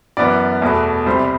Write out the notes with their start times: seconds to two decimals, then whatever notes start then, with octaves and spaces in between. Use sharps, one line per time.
0.17 F#2 E3 B3 D5
0.62 E2 B2 A3
1.06 C2 C3 G3 C5